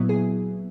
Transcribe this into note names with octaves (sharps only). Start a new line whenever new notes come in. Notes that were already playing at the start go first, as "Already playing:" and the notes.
Already playing: A#2 F#3 B3 E4
G#4